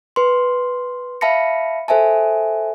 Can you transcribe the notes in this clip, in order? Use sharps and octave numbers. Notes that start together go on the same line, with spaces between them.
B4 C6
E5 F5 A5 B5 A#6 C#7
A4 C5 E5 G#5 A5